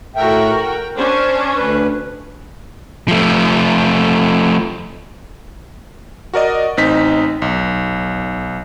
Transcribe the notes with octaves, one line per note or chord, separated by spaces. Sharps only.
A2 F#4 A#4 E5 G5
G5
C#4 D4 C5
D2 B4
F3 A3
F#4 A#4 D5 D#5
A1 C4 D#4 B6
B1